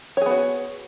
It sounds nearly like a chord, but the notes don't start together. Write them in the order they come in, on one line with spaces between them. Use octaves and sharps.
C#5 G#4 B3 F#4